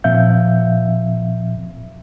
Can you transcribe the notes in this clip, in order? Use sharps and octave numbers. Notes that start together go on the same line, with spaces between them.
A#2 F3 C4 E5 F5 G6